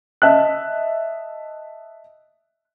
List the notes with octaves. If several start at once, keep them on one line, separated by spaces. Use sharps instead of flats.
D#5 E5 A5 F#6